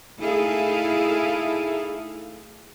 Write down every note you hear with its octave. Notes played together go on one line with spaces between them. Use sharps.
A3 D#4 E4 G#4 A4 F5